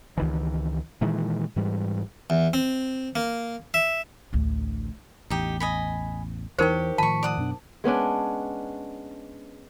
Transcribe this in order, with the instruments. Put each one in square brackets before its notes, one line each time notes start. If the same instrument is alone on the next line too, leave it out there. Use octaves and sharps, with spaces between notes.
[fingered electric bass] C#2 D#3 E3
A#2 D#3 E3 G#3
G#2 E3 G3
[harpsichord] E2
C4
A#3
E5
[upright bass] A1 D2
[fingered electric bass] A1 E2 [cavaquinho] D#4 G4
[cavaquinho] D#5 G#5 B5
[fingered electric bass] E2 E3 [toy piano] D#4 A#4 C5 [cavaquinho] G4 C#5
[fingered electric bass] A2 D#3 F3 [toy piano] A5 [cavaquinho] B5 C#6
[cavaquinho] D5 F#5 D#6
[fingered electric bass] F#2 B2 D4
[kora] G#3 B3 C#4 D4